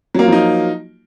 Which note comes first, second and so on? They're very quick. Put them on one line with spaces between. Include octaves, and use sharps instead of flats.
F#3 A#3 F4 F3 D#4